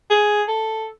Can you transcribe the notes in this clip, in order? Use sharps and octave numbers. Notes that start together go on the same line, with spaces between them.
G#4
A4